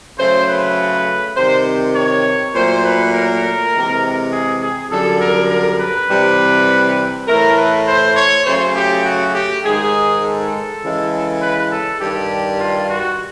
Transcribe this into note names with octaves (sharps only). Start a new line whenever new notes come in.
C#3 F#3 A3 C5
B4
C3 D#3 G3 C5
C#5
A#2 F#3 A3 C5
B4
A#4
C3 E3 G#3
G#4
G#4
F#2 D3 G3 A4
A#4
A#4
B4
C3 E3 G3
A2 E3 A3 A#4
B4
C5
C#5
C#3 F#3 A3 C5
G4
F#4
G4
G#2 D#3 G#3 G#4
A4
C#3 E3 G#3
B4
A4
G2 D#3 G3 G4
F4
F#4